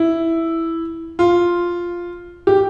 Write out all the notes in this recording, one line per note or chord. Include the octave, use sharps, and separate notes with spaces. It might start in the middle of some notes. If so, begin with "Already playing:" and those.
Already playing: E4
F4
G4